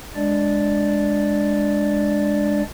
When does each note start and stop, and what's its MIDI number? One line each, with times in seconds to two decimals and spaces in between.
0.15 2.62 56
0.15 2.62 62
0.15 2.62 74